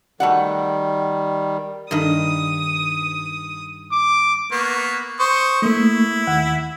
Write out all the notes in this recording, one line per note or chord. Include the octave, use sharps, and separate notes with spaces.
D#3 G3 A3 F#4 F#5
G2 D#3 D#6
D6
A#3 B3 C#6
C5 C#6 D#6
A3 A#3 E4
D#2 F#5